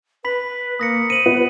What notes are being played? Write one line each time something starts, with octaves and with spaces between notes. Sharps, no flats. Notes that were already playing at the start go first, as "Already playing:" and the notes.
B4 B5 B6 F#7
A#3 D#6 A#6 C#7
C5 D#7 F#7
B3